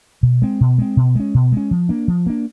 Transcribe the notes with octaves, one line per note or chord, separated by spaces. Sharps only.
B2
G#3 C4
B2
G#3 C4
B2
G#3 C#4
B2
G#3 C#4
F3
A#3 D4
F3
A#3 D4